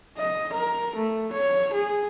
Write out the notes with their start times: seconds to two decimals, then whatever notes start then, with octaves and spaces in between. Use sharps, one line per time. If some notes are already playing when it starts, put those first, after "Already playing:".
0.17 D#5
0.53 A#4
0.96 A3
1.33 C#5
1.74 G#4